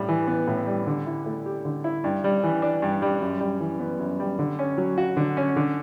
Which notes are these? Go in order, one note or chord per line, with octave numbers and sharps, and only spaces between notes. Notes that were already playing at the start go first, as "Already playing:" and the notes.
Already playing: A2 G3
E3
B3
A2
G3
D3
E4
A3
G4
D3
E4
G2
G3
E3
D4
G2
G3
F#2
G3
E3
B3
F#2
G3
D3
C#4
F#3
F#4
D3
C#4
D3